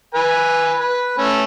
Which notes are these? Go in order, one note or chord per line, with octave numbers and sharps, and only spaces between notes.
B4 G#5
B4
A3 C#4